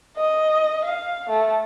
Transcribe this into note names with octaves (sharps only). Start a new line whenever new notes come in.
D#5
F5
A3